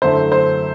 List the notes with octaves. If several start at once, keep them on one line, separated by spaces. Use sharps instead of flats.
F#2 D3 A3 E4 C5
C5